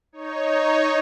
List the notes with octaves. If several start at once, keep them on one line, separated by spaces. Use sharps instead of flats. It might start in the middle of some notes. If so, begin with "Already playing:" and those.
D#4 C#5